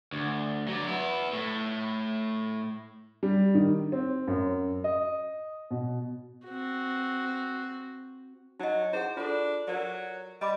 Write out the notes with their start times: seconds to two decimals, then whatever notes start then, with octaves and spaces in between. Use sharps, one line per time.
0.13 D2
0.68 F#3 D5
0.87 B3 E4
1.33 A2 A3
3.23 G3
3.55 D#3
3.92 C4
4.27 F#2
4.84 D#5
5.71 B2
6.46 C4 F#4
8.60 F#3 D#4 D#5
8.93 E4 G#4 C5 F#5
9.17 D4 F4 A4
9.68 F#3 A#4 D5
10.41 G3 D#5 B5 D6